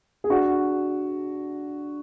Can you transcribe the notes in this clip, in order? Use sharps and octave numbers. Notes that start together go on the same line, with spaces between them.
G#4
D4 F#4